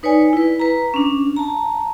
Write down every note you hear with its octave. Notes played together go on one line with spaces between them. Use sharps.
D#4 B4 C#5 D5 G#5
E4 B4
B4 A#5
C#4 D4
A5 A#5